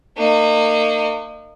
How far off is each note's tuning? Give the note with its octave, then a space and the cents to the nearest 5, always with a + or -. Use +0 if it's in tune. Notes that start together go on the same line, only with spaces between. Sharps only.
A#3 -35 D#4 -35